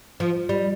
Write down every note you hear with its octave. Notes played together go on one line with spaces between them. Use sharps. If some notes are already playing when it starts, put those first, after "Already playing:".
F3
G3